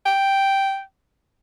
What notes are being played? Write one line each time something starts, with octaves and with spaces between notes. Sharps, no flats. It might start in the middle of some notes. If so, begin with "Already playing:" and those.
G5